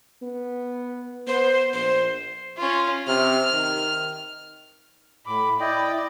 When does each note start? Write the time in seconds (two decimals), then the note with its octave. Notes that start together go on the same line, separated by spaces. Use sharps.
0.22 B3
1.27 B3 C5
1.74 A#1 C5
2.58 C#4 F4
3.07 C3 F6
3.52 D#3
5.27 A2 B5 D6
5.60 E4 D5 D#5 G5